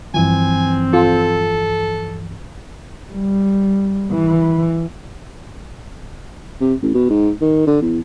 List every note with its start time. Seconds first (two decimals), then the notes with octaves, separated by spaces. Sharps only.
0.14 G2 E3 F3 C4 G#5
0.93 F4 A4
3.13 G3
4.12 E3
6.61 C3
6.82 A1
6.94 B2
7.10 G#2
7.41 D#3
7.67 D3
7.81 E2